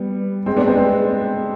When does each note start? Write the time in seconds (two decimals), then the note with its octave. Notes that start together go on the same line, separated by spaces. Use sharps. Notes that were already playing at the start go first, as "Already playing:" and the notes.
Already playing: G3 B3
0.46 G#3 C4
0.57 B3 D4
0.66 G#3 C4
0.77 G#3 C4